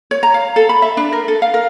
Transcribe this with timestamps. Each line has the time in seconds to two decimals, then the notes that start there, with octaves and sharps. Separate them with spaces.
0.11 C#5
0.23 A#5
0.34 F5
0.56 A4
0.69 B5
0.82 E5
0.97 D4
1.12 A#4
1.28 A4
1.42 F5
1.54 A#4